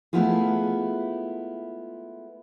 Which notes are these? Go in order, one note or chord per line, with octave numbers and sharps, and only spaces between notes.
G#3 A3 B3 E4 F4 G#4